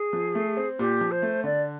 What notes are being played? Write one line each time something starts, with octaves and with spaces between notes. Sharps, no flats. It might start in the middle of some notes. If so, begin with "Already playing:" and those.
Already playing: G#4
F3
A3
C4
A#2 G4
F3
C5
A3
D3 D5